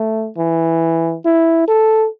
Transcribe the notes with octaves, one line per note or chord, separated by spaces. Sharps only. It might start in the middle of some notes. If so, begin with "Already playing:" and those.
Already playing: A3
E3
E4
A4